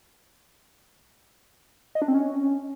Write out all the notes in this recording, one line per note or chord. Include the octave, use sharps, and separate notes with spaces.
D#5
D4
C4
C#4